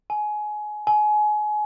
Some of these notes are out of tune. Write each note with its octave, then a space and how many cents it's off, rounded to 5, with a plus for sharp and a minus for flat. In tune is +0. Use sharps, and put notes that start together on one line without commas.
G#5 +20
G#5 +25